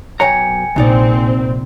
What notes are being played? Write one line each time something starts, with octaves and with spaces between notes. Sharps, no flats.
B1 C#5 G5 G#5 A#5 C#7
A#1 C3 C4 D#4 D5